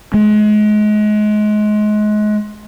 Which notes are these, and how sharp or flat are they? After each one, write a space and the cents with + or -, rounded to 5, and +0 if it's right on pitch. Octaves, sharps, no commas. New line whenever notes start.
G#3 +30